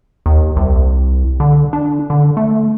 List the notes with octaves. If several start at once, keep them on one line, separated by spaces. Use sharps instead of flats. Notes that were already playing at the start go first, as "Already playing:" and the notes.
D#2
C2
D3
D4
D3
A3